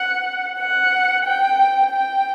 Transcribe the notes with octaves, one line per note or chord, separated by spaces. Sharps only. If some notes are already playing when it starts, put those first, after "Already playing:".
Already playing: F#5
F#5
G5
G5